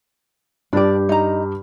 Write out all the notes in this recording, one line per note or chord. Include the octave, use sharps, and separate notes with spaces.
G2 D4 G4 D5
D#4 A#5